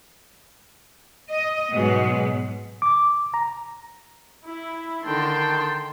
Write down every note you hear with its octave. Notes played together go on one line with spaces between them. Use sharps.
D#5
G#2 B2 F#3 G#3 B3
D6
A#5
E4
D3 D#3 G5 A5 C6